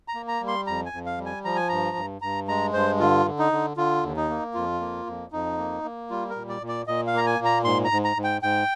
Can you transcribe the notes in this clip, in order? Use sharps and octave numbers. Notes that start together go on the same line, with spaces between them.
A#5
A#3
A#5
G3
C6
F2 A#5
G#5
F2
F5
G3
G#5
F3 A#5
G#5
G2 A#5
G2
G2 A#5
G#3 A#5
G2 C5
D3 F4
D3
D#4
D3
D3 F4
D#2
D#4
A#3
F2 F4
A#3
F2
F2 D#4
A#3
A#3
G3 F4
A#4
A#2
D5
A#2
D5
A#2 D#5
F5
A#3 A#5
G#5
A#2
A#5
G#2 C6
A#5
G#2
A#5
G#2
G5
G#2 G5